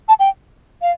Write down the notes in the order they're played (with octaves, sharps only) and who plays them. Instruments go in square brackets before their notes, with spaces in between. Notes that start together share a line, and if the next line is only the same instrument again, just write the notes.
[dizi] A5
G5
F5